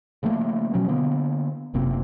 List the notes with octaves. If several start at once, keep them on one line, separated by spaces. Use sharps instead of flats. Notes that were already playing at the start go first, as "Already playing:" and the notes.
C#3 F3 A3 A#3
B2 F3 F#3 C#4
D3 A#3 B3
F#1 C3 A#3 C4